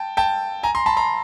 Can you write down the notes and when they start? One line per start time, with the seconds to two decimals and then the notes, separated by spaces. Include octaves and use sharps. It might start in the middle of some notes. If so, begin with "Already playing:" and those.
Already playing: G5 A5
0.17 G5 A5
0.63 G#5 A#5
0.75 A#5 C6
0.86 A5 B5
0.97 A#5 C6